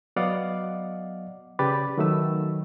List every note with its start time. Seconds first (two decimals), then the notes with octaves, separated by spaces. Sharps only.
0.16 F#3 B3 D5 D#5 F5 F#5
1.59 C#3 G4 B4 D5 B5 A6
1.98 D#3 F#3 A3 B4 E6